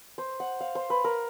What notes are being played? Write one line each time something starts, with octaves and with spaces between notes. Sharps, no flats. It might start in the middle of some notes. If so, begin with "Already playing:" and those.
C5
F#5
F5
C5
B4
A#4